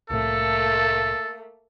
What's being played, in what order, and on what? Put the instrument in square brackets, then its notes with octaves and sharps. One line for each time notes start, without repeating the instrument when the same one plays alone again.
[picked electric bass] C2 A2 [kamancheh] A3 A#3 [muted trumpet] A4